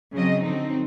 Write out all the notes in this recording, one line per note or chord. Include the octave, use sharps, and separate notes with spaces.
C#3 F#3 C4 D#5
D3 F#3 C4 D#4